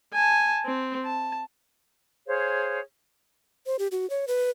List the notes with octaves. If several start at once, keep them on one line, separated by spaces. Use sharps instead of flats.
G#5 A5
C4
A5
G#4 C5 C#5 F5
C5
G4
F#4
C#5
B4